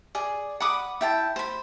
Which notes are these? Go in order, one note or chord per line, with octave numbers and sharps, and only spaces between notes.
G#4 D5
F#5 B5 D6 D#6
E4 G5 A5
C5 B5